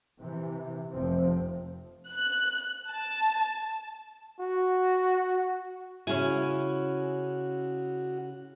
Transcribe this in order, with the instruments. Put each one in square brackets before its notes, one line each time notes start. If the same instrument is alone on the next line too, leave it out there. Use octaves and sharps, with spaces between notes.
[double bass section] C3 E3
F1 C3 F3 C4
[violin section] F#6
A5
[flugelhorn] F#4
[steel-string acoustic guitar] C#3 E4 [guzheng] C#4 G#5 [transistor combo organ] F#4